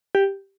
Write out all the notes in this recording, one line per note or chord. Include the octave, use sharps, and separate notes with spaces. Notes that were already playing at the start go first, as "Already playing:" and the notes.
G4